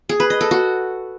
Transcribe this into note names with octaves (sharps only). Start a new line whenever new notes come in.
G#4
B4
D#5
A4
F#4